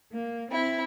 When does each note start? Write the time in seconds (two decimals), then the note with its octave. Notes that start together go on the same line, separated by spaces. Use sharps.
0.12 A#3
0.50 C4 E4